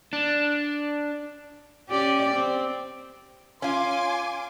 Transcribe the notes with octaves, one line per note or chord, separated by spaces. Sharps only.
D4
C#4 G4 D5
C4
C#4 F4 G#5 C6 D6